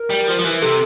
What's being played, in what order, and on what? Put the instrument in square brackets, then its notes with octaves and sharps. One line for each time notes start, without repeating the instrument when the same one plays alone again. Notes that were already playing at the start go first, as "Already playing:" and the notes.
Already playing: [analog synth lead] A#4
[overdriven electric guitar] G3
F3
F3
E3
[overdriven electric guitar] C3 [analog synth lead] A4